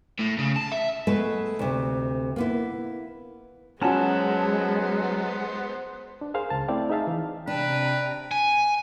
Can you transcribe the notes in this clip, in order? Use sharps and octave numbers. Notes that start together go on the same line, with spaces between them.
A2
C#3
A5
E5
G#3 A3 B3 B4
D2 C3
A#3 B3 E4
F#3 G#3 B3 C#4 F#4 C5 F#5 A5
D4
G#4 A#4 C5 F5
C#2 A5
A3 C4 E4 D5 F5 G5
D#4 G#4 E5 F5 A5
E3
C3 D4 B4 G5 A#5
G#5